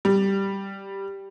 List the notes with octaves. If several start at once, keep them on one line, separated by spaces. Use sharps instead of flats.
G3